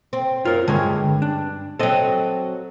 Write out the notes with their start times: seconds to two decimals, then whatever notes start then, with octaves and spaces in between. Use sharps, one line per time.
0.13 C4
0.45 F#2 F4 A#4
0.68 G2 D3 G#3 C#5
1.22 D4
1.79 F#3 C4 A4 D#5